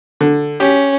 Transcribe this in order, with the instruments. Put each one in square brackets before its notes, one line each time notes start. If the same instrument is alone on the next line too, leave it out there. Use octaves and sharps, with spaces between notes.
[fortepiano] D3
[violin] C#4 [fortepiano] G4